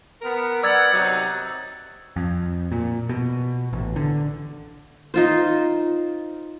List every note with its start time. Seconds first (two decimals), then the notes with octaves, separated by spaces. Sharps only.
0.22 B3 A#4
0.64 B3 D5 F#5 E6 G#6 A6
0.94 C3 F#3 D#4
2.16 F2
2.72 A#2
3.09 B2
3.73 A1
3.96 D3
5.14 D#4 F4 C5